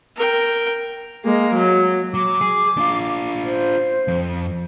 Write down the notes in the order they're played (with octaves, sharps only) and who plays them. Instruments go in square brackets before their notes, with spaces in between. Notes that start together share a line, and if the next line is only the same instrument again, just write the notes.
[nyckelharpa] A#4 G5
[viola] G#3 A#3
F#3
[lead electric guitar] F#3 [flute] D6
[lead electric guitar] G#4
D4 F4
[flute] C5
[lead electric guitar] F2